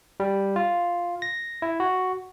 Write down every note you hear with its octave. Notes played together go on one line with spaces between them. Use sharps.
G3
F4
A#6
E4
F#4